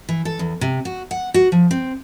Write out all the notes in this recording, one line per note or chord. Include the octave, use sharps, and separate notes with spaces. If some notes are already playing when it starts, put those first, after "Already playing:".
E3
A4
E2
C3
F#4
F#5
F#4
F3
C4